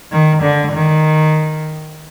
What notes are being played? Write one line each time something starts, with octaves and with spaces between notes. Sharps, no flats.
D#3
D3
D#3